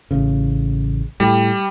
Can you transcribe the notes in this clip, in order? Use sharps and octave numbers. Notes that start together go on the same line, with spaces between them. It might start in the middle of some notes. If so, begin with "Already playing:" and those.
A1 C#3
A2 G3